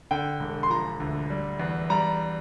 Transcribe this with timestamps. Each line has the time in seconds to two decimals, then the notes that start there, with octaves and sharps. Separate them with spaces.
0.11 D3 G5
0.40 E1
0.63 C6
0.70 F3 A#5
1.00 D2
1.30 G3
1.59 E2
1.90 G3 A#5